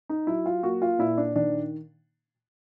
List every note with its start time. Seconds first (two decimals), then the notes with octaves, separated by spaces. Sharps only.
0.09 D#4
0.27 F#3 E4
0.46 F4
0.63 A#3 F#4
0.82 F4
0.99 A#2 E4
1.18 D4
1.36 D#3 D4